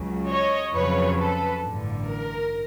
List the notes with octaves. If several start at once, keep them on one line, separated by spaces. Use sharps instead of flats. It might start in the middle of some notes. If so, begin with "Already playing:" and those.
Already playing: C#2 C#3 F#3
C#5 D#5
F2 C#3 F#3 B4 C#5
A4 B4
A1 G2 D3
A#4